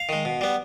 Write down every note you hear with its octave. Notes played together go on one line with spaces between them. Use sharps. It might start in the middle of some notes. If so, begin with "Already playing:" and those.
Already playing: F5
D#3 G#3
B2
G3 B3